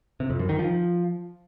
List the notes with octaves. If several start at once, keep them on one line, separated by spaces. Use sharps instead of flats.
C3
F2
F#2
D#3
F3